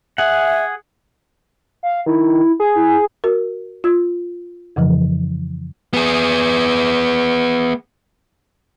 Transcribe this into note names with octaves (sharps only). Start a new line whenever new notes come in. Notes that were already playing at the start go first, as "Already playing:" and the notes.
G#4 E5 F#5
F5
D#3 E4
G#4
E4
F#4 A#4
F4 E6 G#6
F2 C#3 E3 F3
B3 G#4